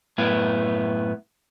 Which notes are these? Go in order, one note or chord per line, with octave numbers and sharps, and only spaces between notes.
F#2 A2 B3 E4